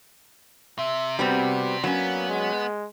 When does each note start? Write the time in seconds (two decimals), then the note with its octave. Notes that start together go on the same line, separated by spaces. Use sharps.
0.79 C3 E5
1.19 G3 B3 C4 F#4
1.84 F#3 A#3 B3 C#4
2.29 G#3